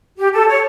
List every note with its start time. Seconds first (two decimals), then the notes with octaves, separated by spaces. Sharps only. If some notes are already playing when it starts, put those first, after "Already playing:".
0.17 G4
0.33 A4
0.48 C#5